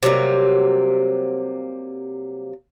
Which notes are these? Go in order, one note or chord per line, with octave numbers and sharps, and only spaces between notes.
C3 F#3 G3 A#3